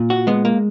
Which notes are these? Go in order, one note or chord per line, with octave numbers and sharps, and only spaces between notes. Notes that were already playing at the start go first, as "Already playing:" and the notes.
Already playing: A#2
F#4
G#3 B3
A#3